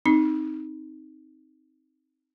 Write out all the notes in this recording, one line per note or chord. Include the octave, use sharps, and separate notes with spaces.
C4 D#4